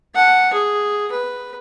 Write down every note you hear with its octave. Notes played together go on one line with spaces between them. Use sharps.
F#5 A5
G#4
B4